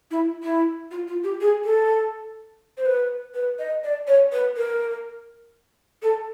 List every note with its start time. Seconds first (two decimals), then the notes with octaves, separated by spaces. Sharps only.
0.11 E4
0.43 E4
0.91 F4
1.08 F4
1.24 G4
1.41 G#4
1.65 A4
2.78 C5
2.86 B4
3.34 B4
3.59 D#5
3.84 D5
4.07 C#5
4.32 B4
4.57 A#4
6.02 A4